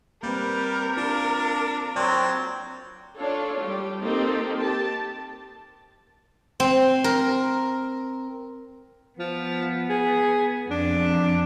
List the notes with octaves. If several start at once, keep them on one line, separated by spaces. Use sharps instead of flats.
G3 A#3 C4 A#4 B4
D4 F4
F#3 C4 D5
D4 F4 A4 C#5
G3 G4
A#3 C4 D#4 G4 A4
G4 A5
C4
A#4
F3 B3
G#4
F2 D4